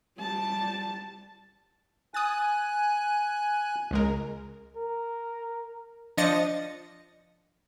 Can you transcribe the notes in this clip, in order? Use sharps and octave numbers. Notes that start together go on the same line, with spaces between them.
G3 A5
G#5 D#6 F#6 A6
C#2 G#3 A#4
A#4
F3 D4 D#5 A6 A#6 C#7